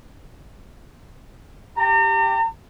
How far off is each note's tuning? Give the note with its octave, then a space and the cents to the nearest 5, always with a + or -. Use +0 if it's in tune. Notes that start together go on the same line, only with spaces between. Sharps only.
G4 +0 A#5 -40